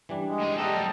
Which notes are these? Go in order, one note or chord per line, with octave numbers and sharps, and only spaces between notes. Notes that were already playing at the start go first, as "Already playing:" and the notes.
E3 G3 D4
G#3
A2 G#4
G3 G4 A4 D#5 E5 F#5 A5 A#5
F#3